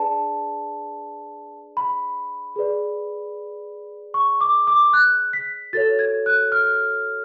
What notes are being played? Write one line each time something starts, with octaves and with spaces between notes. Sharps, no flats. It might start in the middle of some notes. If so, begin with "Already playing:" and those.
Already playing: D4 G#4 B4 D5 A5
B5
G#4 B4 D5
C#6
D6
D6
F#6
B6
F#4 A4 C#5 A6
G#6
F#6
F6